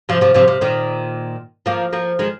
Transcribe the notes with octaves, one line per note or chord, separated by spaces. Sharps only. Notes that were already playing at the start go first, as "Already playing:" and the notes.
C3 F3
C3 F3
C3 F3
C3
A#2 D#3
F3 A#3
F3 A#3
D#3 G#3